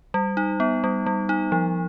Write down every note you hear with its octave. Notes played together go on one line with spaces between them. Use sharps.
G3
D#4
B3
G3
G3
D#4
F3